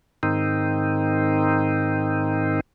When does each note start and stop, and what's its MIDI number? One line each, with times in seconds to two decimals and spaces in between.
0.23 2.60 44
0.23 2.60 51
0.23 2.60 60
0.23 2.60 63